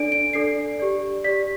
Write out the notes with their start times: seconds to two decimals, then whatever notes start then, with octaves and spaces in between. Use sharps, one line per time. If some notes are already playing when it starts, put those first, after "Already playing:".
Already playing: D4 A4 D5 D7
0.12 D7
0.33 D4 A4 D5 C7
0.80 G4 D5
1.24 G4 D5 B6